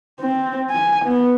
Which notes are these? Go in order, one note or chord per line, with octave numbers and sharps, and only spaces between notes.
C4
G#5
B3